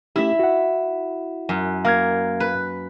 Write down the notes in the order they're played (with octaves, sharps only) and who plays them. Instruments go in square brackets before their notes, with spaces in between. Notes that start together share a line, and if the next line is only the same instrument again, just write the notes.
[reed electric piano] A3 C#4 G4 [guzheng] E4 E5
[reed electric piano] F#4 F#5
[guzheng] F#2
[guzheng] A#3 [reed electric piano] F5 F6 G#6
[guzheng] B4